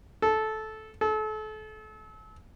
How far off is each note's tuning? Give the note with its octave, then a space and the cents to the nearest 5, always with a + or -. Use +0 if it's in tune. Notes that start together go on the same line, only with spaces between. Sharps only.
A4 -15
A4 -35